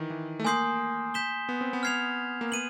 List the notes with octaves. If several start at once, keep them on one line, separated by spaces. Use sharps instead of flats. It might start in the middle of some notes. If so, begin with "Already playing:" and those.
Already playing: D#3 E3
E3
A3
A#3 G#5 C6 D#6 G6 C7
G6 B6 E7 G7
B3
C4
B3
F6 G#6 C7 F7
A#3
B3 D#7 F#7